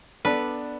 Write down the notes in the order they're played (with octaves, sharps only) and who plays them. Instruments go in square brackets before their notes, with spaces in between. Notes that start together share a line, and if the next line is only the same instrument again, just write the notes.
[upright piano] B3 D4 A4 D5 [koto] B4